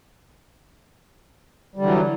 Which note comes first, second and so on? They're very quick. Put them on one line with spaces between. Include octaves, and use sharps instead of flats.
G3 D3 E3 F#3